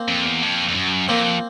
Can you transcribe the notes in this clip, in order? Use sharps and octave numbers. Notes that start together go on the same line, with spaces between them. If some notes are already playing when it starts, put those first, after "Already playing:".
Already playing: A#3 C4
F2
E2
F2
F2
F#2
F2 A#3 C4